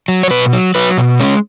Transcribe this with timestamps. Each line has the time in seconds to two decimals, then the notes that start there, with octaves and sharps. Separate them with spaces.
0.08 F#3
0.23 C#5
0.30 B2 B4
0.53 F#3
0.75 F#3 B4
0.98 B2
1.19 G#3 C#4